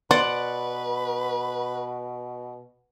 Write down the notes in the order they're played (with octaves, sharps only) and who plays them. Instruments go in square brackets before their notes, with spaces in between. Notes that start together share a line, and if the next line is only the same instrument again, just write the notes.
[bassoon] B2 [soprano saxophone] B4 [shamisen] C5 [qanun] D5 F#5